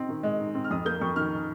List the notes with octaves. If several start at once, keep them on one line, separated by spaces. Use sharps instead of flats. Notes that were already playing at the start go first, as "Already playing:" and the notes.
Already playing: C4 D#4
D#3
G#3
D#4
C4
F6
F2 D#6
A#3 G6
F2 C#6
D#3 F6